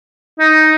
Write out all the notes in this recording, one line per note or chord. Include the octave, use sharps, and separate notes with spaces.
D#4